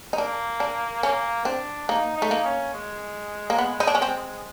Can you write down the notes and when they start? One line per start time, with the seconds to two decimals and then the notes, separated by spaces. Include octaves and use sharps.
0.13 D#4
0.18 A#3 D4
0.60 D4
1.03 A#3 C#4
1.45 C4 D4
1.89 A#3 D#4
2.17 A3 D#4
2.31 A#3
2.45 C#4
2.74 G#3
3.50 A#3
3.58 B3
3.80 D#4
3.87 D4
3.95 C#4
4.02 C4